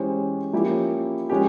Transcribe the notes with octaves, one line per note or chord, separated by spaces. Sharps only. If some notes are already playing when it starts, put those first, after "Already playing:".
Already playing: E3 G#3 C#4 G4 C5
F3 A#3 C#4 E4 G4
F3 G#3 C#4 G4